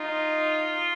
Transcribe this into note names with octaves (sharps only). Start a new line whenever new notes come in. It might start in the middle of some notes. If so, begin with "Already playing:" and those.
Already playing: D#4 F4